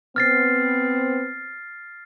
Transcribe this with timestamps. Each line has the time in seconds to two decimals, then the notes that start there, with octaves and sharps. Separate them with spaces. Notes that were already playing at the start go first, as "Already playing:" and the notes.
0.16 B3 C4 F6 A6 C7